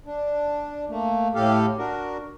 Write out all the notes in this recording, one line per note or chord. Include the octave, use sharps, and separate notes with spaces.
D4
A3 A#3
A2 G4 A4 F5
D4 F#4 A#4